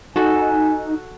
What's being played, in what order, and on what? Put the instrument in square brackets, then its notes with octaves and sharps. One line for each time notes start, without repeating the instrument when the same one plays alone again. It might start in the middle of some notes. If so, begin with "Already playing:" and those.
[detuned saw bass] D#4 [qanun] F#4 A4 [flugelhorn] G#5